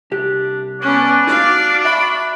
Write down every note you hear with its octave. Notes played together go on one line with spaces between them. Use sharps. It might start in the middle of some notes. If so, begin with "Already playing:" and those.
C2 D4 G4
B3 C#4 D4 D5 F#5
D#4 F#4 F5
F#4 E5 B5